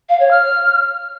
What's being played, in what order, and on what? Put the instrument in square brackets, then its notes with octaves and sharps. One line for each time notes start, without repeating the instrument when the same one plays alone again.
[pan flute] F5
C#5
F6